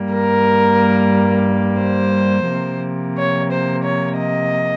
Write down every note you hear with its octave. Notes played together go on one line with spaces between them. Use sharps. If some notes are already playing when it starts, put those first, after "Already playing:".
Already playing: G2 G3 A#3
A#4
C5
C3 F3 A#3
C#5
C5
C#5
D#5